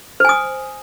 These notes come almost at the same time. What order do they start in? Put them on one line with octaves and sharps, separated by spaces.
C5 G#5 D#6